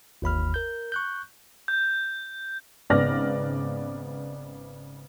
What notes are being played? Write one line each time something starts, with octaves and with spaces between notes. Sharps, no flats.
G1 D#2 B5 F6
A#4 G6
C#6 F#6 G6
G6
G#1 C#3 B3 D5 F6 A#6